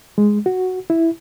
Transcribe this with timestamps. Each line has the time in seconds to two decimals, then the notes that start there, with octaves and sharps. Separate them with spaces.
0.18 G#3
0.46 F#4
0.90 E4